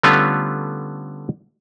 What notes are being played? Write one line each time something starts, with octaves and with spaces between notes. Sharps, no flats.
D3 G3 A3 B3 C#4 F4